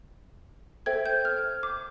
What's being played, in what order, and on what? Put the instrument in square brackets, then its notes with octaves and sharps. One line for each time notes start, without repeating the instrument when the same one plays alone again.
[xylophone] A4 C5 E5 G5 G#6
G6
F6
D6